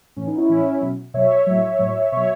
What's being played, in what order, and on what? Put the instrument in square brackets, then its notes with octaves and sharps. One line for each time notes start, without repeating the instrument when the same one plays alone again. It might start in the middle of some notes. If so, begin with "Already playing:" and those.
[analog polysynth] A2 E3 C#4
B3 D#4
C#4 E4
A2 E3
B2 F#3
B2 F#3 C#5 E5
A2 F#3
A2 F#3
B2 F#3 C#5 E5